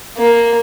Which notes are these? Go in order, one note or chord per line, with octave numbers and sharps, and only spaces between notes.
A#3